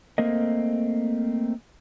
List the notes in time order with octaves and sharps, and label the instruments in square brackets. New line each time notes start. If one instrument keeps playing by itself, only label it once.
[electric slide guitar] A3 A#3 C4 A#4 D#5